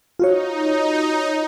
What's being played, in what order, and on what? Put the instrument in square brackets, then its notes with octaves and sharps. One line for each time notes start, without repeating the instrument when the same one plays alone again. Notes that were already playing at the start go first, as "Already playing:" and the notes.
[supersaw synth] D#4 [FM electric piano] F4 F#4 C#5